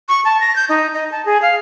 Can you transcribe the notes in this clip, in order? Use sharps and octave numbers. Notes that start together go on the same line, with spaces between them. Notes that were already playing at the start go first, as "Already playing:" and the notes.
C#6
A5
A#6
G6
D#4
D#5
A5
G#4
F5